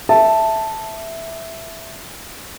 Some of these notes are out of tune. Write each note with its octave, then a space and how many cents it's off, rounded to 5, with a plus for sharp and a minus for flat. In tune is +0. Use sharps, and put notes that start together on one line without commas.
E5 +0 A5 +0